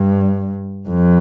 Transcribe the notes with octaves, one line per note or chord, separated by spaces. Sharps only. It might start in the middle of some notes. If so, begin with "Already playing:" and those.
Already playing: G2
F2